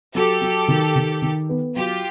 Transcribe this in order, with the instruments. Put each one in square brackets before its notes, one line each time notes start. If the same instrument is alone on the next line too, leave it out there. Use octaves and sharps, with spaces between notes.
[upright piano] F#3 [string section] G4 A4
[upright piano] F#3
D#3
D#3
D#3
B3
[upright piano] F#3 [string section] F4 G4